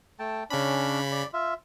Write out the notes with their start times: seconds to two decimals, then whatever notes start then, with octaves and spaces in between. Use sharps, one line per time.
0.19 A3 G5 A5
0.50 C#3 C#4 D4 B5
1.12 D5
1.33 F4 E5